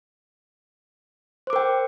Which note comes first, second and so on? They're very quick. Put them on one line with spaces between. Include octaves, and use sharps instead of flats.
C5 D6 A#4 G5